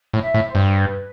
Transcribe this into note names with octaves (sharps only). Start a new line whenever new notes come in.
A2
E5
A2
C5
G2
B4